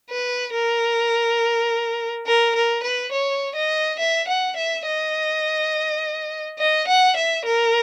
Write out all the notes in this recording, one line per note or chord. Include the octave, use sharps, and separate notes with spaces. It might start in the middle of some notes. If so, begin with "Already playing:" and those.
B4
A#4
A#4
A#4
B4
C#5
D#5
E5
F#5
E5
D#5
D#5
F#5
E5
A#4